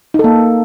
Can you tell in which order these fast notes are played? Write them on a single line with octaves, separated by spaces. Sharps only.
D#4 A4 A#3